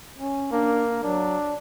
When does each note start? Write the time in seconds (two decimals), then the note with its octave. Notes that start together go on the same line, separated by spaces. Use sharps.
0.18 C#4
0.52 A#3 D4
1.04 F#3 D4